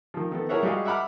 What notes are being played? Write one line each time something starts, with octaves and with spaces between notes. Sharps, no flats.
D#3 F3
D#3 B3 A4
E4 G#4 A#4 C#5 E5 F#5
G3 G#3 F#4 G#4 D#5 F5
E5 F#5 B5 D6 F6